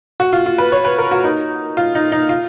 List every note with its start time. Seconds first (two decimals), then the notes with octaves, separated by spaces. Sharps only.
0.20 F#4
0.33 F4
0.46 F4
0.58 B4
0.72 C#5
0.85 B4
0.98 A#4
1.11 F#4
1.24 D#4
1.77 F4
1.95 D#4
2.12 D#4
2.29 F4